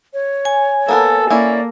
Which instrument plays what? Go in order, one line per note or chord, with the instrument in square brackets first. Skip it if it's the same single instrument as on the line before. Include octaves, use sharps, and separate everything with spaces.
[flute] C#5
[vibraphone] G#5
[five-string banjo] A#3 B3 A#4 [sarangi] A4
[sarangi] A#3 [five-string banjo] C#4 E4 [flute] D5